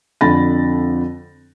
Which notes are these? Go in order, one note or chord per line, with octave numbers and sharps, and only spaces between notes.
F2 D3 B5 A6 A#6